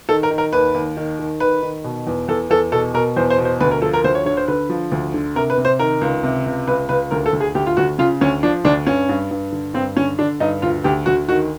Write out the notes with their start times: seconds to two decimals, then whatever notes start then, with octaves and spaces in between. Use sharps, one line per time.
0.09 D#3 A4
0.23 A#4
0.30 D#3
0.38 A#4
0.53 D#2 B4
0.74 D#2
0.97 D#3
1.19 D#3
1.40 D#3 B4
1.62 D#3
1.84 B2
2.07 E2
2.28 E2 A4
2.50 E2 A4
2.72 B2 A4
2.94 B2 A#4
3.16 E2 C5
3.30 C5
3.38 B2
3.45 C5
3.60 D2 B4
3.71 A#4
3.82 F3 A4
3.93 A#4
4.04 D2 C5
4.15 C#5
4.26 D3 C#5
4.37 C5
4.48 D3 B4
4.69 F3
4.92 D2
5.14 D3
5.35 C3 A#4
5.50 B4
5.58 C3
5.65 C5
5.79 D#3 A#4
6.01 C#2
6.23 C3
6.46 C#2
6.67 C#2 B4
6.89 C#2 B4
7.11 D2 A#4
7.26 A4
7.33 D2
7.41 G#4
7.55 D2 G4
7.66 F4
7.77 D2 F#4
7.99 C#3 F4
8.21 D2 C#4
8.43 F3 D4
8.65 D2 D4
8.87 G2 C#4
9.09 G2
9.31 G2
9.52 D3
9.74 G2 C4
9.97 D3 C#4
10.19 D3 D4
10.40 G2 D#4
10.62 D2 F4
10.84 D2 G4
11.06 D2 F#4
11.28 D#3 F#4